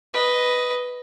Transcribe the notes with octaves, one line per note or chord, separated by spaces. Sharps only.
B4 D#5